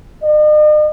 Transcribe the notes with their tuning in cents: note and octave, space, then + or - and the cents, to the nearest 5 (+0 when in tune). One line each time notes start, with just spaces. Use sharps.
D#5 -45